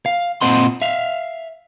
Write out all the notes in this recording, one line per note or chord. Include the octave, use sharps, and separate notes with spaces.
F5
A#2 C4 C5 D#5 F#5 C6
E5 F5